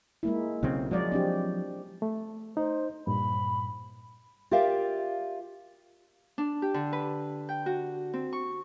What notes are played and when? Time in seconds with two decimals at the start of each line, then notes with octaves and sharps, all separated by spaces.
0.23 G#3 A#3 E4
0.63 B1 C#3 C4
0.91 F3 F#3 G#3 D5
1.12 C4 D4 G4
2.02 A3
2.57 D#4 C5
3.07 G2 A#2 B5
4.51 F4 G4 A#4 D5 E5 F5
6.38 D4
6.62 G4
6.74 D3
6.93 B4
7.49 G5
7.66 F#4
8.14 C4
8.33 C#6